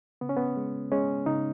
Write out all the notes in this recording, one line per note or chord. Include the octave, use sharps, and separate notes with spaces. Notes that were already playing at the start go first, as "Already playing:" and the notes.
C#3 B3
C#4
B3
G#3
G#3 C#4
C#3 D#4